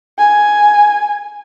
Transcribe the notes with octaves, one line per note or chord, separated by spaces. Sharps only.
G#5